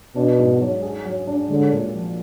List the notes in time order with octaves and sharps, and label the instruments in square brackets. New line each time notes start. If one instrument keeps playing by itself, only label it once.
[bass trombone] B2 [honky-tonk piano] D4
[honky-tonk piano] G#2
F#3
G#4
F#3
D4
[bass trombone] D3 [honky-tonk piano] G#3
[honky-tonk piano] A#2
F3